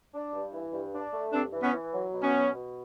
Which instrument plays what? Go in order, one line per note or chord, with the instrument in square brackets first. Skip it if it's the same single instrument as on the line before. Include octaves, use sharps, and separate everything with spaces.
[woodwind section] D4
G2
E3
G2
D4
A3
[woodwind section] G2 [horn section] C4 D4
[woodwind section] E3
[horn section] B3 C#4
[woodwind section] E3
F#3
B2
[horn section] B3 C#4
[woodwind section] B2
B2